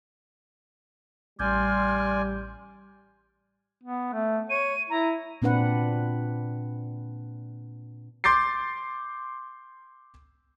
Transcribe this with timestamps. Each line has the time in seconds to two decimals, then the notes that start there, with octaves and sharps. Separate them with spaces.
1.39 A1 G3 D5 G#5 C6 F6 G6
3.83 B3
4.13 A3
4.50 C#5 D#7
4.90 E4 A#5
5.42 A#2 C4 D4 B4 F#5
8.24 C6 D6 G6 A6 C7